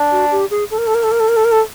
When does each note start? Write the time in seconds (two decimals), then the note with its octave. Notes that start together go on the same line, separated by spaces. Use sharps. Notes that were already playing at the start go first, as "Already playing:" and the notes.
Already playing: D4
0.11 F#4
0.31 G4
0.51 G#4
0.71 A4
0.78 A#4
0.87 A4
0.95 A#4
1.03 A4
1.12 A#4
1.20 A4
1.29 A#4
1.37 A4
1.45 A#4
1.52 A4